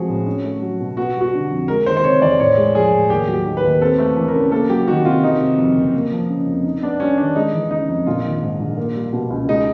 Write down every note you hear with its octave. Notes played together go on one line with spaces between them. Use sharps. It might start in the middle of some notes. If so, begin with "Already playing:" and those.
Already playing: F3 G#3 C4 F#4 G#4
A2
C#4
A3
F#3
B2
B3 F#4
G3
F#4
D3
F2
G#3 A#4
D#3 C5
C5
C3 C#5
E2 D5
A2 C#5
G#3
F3 G#4
A2
D#2 G4
F#3
G4
D#3
B4
D#2
C4 A4
A3
E3
A#4
C#3
A#3 A4
F#3 G4
D#3 F#4
C3 F4
D#3 D#4
C3
F2
F#1
A#3
F3
C#3
F2
D#4
B3 D4
G3 C#4
D#3 D4
G#3 D#4
E3
C#3 D#4
F2
A#1 F4
D#3
G#2
A#1
A#3
G3
B2
C#2
G#3 D#4